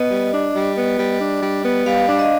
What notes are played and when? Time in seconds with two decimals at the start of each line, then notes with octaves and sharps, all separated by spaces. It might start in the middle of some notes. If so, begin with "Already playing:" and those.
Already playing: B3 D#5
0.10 G3
0.32 D4
0.54 G3
0.76 B3
0.98 G3
1.20 D4
1.41 G3
1.64 B3
1.86 G3 F5
2.08 D4
2.19 D#5